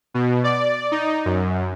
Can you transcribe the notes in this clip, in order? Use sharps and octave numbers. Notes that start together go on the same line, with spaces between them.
B2
D5
D#4
F#2